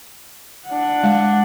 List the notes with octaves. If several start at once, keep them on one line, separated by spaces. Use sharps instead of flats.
D4 F#5
G#3